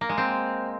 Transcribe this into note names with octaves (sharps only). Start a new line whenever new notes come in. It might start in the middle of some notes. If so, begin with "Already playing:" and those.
A#3
G#3
C4